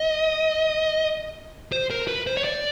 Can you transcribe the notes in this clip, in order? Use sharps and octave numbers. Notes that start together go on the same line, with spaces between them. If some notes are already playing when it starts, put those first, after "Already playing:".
Already playing: D#5
C5
A#4
B4
C5
C#5
D5